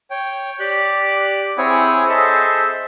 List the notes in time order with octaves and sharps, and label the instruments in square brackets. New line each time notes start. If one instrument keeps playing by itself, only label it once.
[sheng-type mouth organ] C#5 G5
G4 D5 F#6
C4 E4 G#4 C#5 F#5 G#5
G#4 A4 C5 D#5 E5 A5